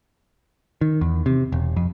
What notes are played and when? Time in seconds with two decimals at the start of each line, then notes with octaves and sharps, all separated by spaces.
0.81 D#3
1.01 E2
1.26 C3
1.52 E1
1.76 F2